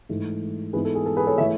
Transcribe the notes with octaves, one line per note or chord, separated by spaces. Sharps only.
G#2 E3 A3
G#2 E3 B3 G#4 B4
A4
G#4
A4
G#4 B4
A4 C#5
E3 A3 C#5 E5